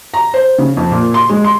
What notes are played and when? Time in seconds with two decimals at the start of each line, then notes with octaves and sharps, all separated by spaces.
0.14 A#5
0.34 C5
0.58 C#3
0.77 F2
0.92 A#2
1.14 C6
1.29 G#3
1.44 C6